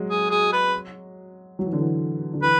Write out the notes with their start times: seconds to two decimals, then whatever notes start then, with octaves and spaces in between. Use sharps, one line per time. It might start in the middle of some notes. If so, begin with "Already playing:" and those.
Already playing: F#3 G#3
0.10 G#4
0.31 G#4
0.53 B4
1.59 F#3
1.66 E3
1.73 D3
1.80 E3
2.33 D3
2.43 E3 B4